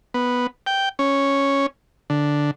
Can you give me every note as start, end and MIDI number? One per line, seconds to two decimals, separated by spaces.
0.14 0.47 59
0.67 0.89 79
0.99 1.66 61
2.10 2.51 50